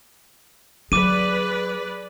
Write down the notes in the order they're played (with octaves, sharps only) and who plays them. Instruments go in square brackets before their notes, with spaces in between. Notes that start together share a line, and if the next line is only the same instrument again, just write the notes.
[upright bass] F#3 [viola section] G#4 B4 D5 [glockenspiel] D6 D#7